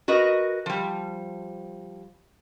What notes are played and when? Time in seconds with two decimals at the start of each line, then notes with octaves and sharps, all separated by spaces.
0.08 F#4 A#4 B4 D#5
0.66 F3 G3